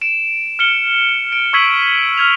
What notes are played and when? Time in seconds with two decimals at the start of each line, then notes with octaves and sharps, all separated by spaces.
0.01 D7 E7
0.59 F6 C#7 G7
1.32 D7
1.53 C#6 E6 G#6 B6 D#7 F#7
2.18 F6 G#6 F7